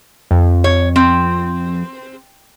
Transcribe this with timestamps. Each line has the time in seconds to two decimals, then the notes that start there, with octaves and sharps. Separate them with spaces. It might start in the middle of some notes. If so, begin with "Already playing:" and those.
0.31 F2
0.64 C#5
0.96 C4